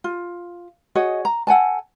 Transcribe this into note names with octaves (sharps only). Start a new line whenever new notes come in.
F4
F#4 G#4 C#5 D#5
A#5
A4 F#5 G#5 A5